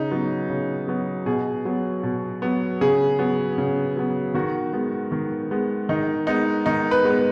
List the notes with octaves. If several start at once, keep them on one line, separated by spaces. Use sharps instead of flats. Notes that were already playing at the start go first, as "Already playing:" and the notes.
Already playing: C#3 D#4
F#3 B3
C#3
F#3 B3
B2 G#4
F#3 B3
B2
F#3 B3
C#3 G#4
F#3 B3
C#3
F#3 B3
D#3 F#4
G#3 B3
D#3
G#3 B3
D#3 D#4
G#3 B3 D#4
D#3 D#4
B4
G#3 B3